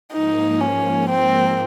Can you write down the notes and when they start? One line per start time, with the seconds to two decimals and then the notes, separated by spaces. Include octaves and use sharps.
0.13 G#2 F3 A#3 D#4
0.61 C#4
1.10 C4